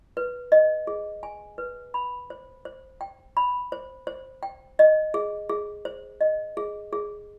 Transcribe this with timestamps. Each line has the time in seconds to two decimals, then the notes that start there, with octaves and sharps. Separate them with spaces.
0.17 B4
0.52 D#5
0.87 G#4
1.23 G#5
1.58 B4
1.94 B5
2.30 C5
2.65 C5
3.01 G5
3.37 B5
3.72 C5
4.07 C5
4.43 G5
4.79 D#5
5.14 G#4
5.49 G#4
5.85 C5
6.21 D#5
6.57 G#4
6.93 G#4